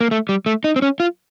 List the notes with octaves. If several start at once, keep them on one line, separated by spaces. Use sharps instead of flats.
A#3
A3
G3
A3
D#4
C4
C#4
F4